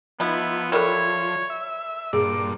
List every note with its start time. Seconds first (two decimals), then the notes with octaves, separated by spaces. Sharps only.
0.20 F3 B3 D#4 E4
0.72 F#3 G3 E4 A4 A#4 C#5
1.50 E5
2.13 G2 A#2 G#4 D6